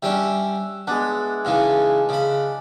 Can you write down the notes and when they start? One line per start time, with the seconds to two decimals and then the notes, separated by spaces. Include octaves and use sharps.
0.03 G3 C#4 D4 E5
0.87 G#3 B3 D4
1.45 G#2 C#3 E3
2.09 C#3 B5